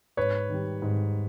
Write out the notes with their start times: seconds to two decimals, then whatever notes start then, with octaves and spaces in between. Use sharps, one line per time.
0.17 G#2 B4 C#5
0.49 D#3 G3
0.82 G#2